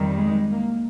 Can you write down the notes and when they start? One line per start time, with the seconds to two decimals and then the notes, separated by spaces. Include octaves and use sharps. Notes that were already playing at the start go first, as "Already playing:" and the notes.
Already playing: F2 D#3 G3
0.17 G#3
0.51 A#3